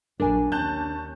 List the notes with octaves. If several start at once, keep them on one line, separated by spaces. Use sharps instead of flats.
A#1 F#3 D4 A#4 G#5
D#2 C#4 A5 F#6 G6